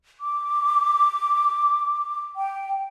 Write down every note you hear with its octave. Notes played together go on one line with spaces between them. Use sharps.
D6
G5